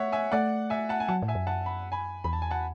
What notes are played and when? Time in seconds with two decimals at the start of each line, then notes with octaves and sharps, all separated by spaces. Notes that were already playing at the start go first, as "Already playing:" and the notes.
Already playing: A3 C#5 E5 F#5
0.12 E5 G#5
0.32 A3 D5 F#5
0.70 E5 G#5
0.89 F#5 A5
1.00 G#5
1.08 F#3 F#5 A5
1.22 A2
1.28 E5 G#5
1.35 F#2
1.47 F#5 A5
1.66 B5
1.92 G#5 B5
2.24 E2 B5
2.33 A5
2.42 G#5
2.51 F#5 A5